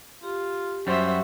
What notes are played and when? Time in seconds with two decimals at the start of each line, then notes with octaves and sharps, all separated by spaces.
0.23 F4 G4
0.87 F#2 G3 F#4 C5 E5